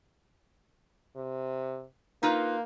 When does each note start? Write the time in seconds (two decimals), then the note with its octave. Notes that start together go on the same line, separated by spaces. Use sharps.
1.16 C3
2.23 A#3 D#4 F4 B4